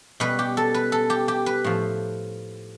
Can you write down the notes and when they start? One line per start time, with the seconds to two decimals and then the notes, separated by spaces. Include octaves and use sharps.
0.20 B2 G3 B4
0.39 G4
0.57 A4
0.74 B4
0.92 A4
1.10 G4
1.28 G4
1.46 B4
1.64 A2 F3